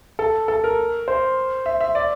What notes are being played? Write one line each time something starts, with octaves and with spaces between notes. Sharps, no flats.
A4
A4
A#4
C5
E5
E5
D5